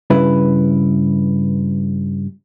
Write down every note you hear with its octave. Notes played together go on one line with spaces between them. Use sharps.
G2 C#3 E4 B4